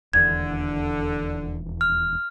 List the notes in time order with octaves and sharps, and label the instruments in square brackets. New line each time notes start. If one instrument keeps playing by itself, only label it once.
[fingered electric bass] D#1 E2 [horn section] D3 [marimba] G#6
[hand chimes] F6